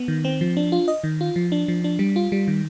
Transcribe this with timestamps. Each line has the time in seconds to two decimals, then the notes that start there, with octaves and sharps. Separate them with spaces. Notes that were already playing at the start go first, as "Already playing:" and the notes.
Already playing: B3
0.08 D#3
0.25 C4
0.41 F3
0.57 D4
0.72 F4
0.88 D#5
1.04 D#3
1.21 F4
1.36 F3
1.52 D4
1.68 F3
1.84 D4
1.99 G3
2.16 F4
2.32 G3
2.48 D#3